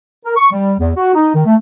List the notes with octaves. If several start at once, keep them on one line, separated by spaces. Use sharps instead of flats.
A#4
C#6
G3
E2
F#4
D#4
D#3
A3